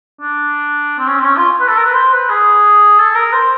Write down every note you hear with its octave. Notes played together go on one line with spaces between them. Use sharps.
D4
C4
C#4
C4
C#4
F4
B4
A4
A#4
B4
C5
B4
G#4
A4
A#4
C5